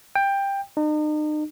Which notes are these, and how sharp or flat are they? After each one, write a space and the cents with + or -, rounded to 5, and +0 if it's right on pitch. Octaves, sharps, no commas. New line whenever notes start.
G5 +15
D#4 -40